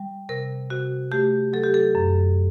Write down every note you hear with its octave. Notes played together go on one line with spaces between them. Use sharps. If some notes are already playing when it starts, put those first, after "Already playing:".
Already playing: G3
C3 A#4
C3 F#4
A3 G4
F#3 A4
G4
A4
F#2